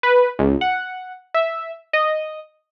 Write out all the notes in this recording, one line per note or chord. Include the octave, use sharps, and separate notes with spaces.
B4
C#2
F#5
E5
D#5